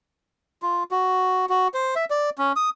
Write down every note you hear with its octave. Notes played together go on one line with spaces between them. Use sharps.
F4
F#4
F#4
C5
E5
D5
C#4
D#6